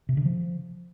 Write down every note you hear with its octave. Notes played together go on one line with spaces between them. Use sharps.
C3
D3
F3